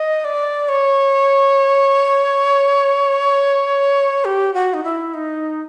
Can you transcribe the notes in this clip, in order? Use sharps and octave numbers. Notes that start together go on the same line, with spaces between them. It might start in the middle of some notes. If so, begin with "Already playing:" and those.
Already playing: D#5
D5
C#5
G4
F#4
D#4
E4
D#4